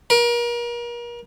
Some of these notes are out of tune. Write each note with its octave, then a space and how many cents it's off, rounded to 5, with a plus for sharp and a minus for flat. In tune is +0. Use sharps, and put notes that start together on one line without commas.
A#4 +35